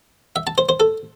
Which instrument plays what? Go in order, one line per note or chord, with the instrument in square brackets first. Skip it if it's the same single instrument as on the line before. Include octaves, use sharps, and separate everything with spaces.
[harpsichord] E5
A5
C5
C5
A4